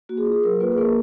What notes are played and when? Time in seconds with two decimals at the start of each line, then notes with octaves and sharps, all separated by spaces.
0.09 A#3 F#4
0.17 G#4
0.26 F4
0.32 G#4
0.44 F#3 A#4
0.60 A#3 F4 B4
0.72 G#4
0.78 A#3 A#4